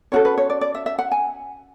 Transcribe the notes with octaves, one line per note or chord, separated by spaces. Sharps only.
C#4 F#4 A4 C#5
B4
C#5
D5
D5
E5
E5
F#5
G#5